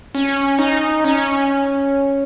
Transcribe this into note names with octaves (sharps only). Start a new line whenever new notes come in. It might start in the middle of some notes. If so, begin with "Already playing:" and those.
C#4
D#4
C#4